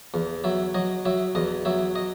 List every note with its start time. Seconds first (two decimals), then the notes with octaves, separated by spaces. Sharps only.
0.14 E2
0.44 F#3 E5
0.74 F#3 D#5
1.05 F#3 E5
1.35 E2 D#5
1.65 F#3 E5
1.95 D#5